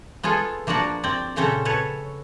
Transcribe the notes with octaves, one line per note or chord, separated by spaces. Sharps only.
B3 F4 G#4 A4
F3 A#3 D4 F#4 D5
C4 D5
A#2 C#3 C4 C#4 A4
A4 B4 C#5